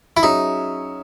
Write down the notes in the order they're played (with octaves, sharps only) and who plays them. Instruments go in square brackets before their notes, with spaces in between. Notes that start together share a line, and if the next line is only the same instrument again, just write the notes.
[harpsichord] E4
[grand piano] F#3 C#4 G#4 C#5 E5 [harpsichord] D#4